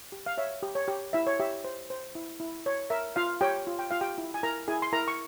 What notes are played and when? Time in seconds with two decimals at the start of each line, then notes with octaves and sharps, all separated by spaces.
0.12 G4
0.26 F5
0.38 C#5 E5
0.63 G4
0.75 C#5
0.88 G4
1.13 E4 E5
1.27 C#5
1.40 G4 E5
1.64 C5
1.90 C5
2.15 E4
2.40 E4
2.66 C#5
2.90 A#4 E5
3.16 F4 F5
3.41 G4 C#5 G5
3.67 F4
3.79 G5
3.91 F4 F5
4.01 G4 G5
4.18 E4
4.34 G#5
4.43 E4 A#4 A#5
4.68 E4 G#4 G#5
4.82 C6
4.93 E4 A#4 A#5
5.08 C#6